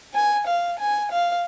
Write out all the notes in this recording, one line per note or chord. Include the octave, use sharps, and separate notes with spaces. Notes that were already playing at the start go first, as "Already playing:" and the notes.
G#5
F5
G#5
F5